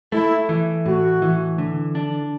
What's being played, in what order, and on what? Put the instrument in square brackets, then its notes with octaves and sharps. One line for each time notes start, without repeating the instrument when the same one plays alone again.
[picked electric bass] A3 [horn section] E4
[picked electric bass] E3
[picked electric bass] A2 [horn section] F#4
[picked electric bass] E3
D3
D4